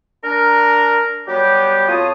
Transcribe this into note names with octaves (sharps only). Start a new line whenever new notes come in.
D4 A#4
F#3 G3 B3 G4
F2 F4 C#5 A5 D#6